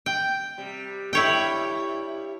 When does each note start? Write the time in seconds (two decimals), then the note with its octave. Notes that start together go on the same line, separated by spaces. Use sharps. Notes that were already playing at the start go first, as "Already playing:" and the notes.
0.06 G5
0.58 C3 G3
1.13 G2 G3 E4 C#5 G5